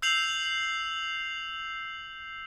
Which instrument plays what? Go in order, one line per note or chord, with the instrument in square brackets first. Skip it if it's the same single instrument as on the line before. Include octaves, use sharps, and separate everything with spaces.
[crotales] E6 G6 C7 F7 F#7